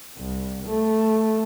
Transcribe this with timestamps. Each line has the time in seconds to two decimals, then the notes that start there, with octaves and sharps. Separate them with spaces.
0.17 C2
0.67 A3